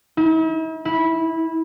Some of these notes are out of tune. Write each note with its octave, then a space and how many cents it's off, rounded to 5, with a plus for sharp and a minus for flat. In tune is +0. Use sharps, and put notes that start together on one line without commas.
E4 -45
E4 -15